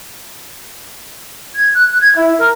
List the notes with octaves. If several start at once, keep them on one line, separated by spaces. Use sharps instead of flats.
G#6
F#6
G#6
E4
A#4